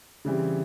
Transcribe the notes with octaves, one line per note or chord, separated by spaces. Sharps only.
C#3 E3 G3 C4